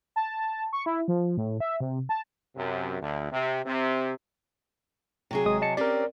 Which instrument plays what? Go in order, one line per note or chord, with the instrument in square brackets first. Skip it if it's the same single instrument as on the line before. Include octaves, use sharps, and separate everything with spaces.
[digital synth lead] A5
C#6
E4
F3
A2
E5
C3
A5
[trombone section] F#2 C3
D2
C3
C3 C4
[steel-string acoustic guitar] C3 F#3 G#4
[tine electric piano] G#1 G#3 D#6
D#5 A5 C#7
[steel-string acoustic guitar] C4 C#4 G4 [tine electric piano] A#4 D5